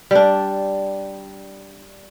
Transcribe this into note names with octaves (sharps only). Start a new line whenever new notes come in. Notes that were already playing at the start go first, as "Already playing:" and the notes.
G3 D4